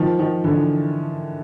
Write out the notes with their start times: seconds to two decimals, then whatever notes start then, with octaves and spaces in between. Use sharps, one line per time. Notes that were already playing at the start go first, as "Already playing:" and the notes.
Already playing: D#3 F3
0.19 D#3 F3
0.44 D3 E3